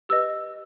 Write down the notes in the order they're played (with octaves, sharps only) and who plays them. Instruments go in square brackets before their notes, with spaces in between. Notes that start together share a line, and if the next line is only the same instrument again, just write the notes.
[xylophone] G4 B4 D#5 E6